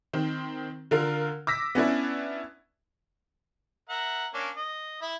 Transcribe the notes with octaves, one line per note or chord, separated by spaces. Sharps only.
D#3 C4
D3 F4 A#4 F5
D6 E6 A#6 B6
B3 C#4 D4 E4
A#4 E5 F#5
A#3 C#4 D4
D#5
E4 E5